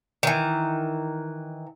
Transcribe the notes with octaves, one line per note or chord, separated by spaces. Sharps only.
D#3 E3